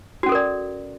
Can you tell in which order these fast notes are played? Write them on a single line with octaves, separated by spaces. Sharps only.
F#4 C#4 A4 A#4 D5